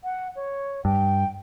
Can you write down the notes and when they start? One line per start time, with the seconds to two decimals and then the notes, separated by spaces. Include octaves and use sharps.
0.04 F#5
0.35 C#5
0.85 G2 G5